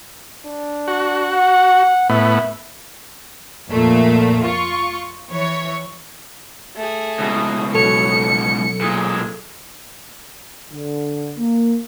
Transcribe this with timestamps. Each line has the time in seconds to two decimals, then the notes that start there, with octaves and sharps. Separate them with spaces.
0.45 D4
0.88 F#4
1.33 F#5
2.10 A2 B3 E5
3.70 F2 A#2 A3
4.44 F4 C#6
5.30 E3 C#5
6.76 A3 G#4
7.19 C#2 B2
7.74 B1 F#3 A4 C#5 C#7
8.81 A#2 G#3
10.72 D3
11.37 A#3